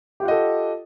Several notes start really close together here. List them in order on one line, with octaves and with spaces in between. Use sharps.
G4 F4 F#5 D#5 A4